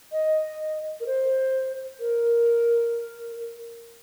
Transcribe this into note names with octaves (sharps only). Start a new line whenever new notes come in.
D#5
A#4
C5
A#4